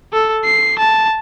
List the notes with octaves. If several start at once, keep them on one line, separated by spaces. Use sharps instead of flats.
A4
C7
A5